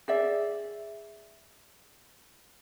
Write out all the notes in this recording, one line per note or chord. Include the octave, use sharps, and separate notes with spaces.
G#4 D5 E5